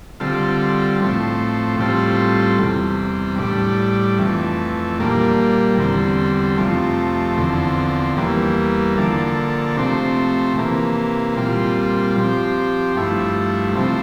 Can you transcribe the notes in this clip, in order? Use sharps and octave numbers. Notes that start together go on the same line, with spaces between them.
D3 G3 C4 F4 A4
A2 F3 A3 C4
A2 G3 C4 F4 A4
E2 C3 G3
A2 G3 D4
F2 E3 A3
A#2 G3 A#3 D4
E2 D3 G3 C4
F2 C3 F3 A3
E2 D3 F3 C4
E2 E3 G3 A#3
D3 F3 A#3 D4 A4
C3 F3 A3 C4
C3 E3 A#3
A#2 G3 C4 F4
F3 C4 G4
G2 F3 A3 E4
C3 F3 A3 C4